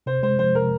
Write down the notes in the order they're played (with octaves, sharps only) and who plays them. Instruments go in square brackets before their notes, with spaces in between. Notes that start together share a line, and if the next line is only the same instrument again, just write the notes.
[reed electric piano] C3 [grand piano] C5
[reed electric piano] G#3 [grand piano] C5
[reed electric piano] F3 [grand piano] C5
[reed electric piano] C3 [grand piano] A#4